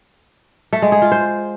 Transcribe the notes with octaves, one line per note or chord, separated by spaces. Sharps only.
A3
G#3
G#4
F4
C5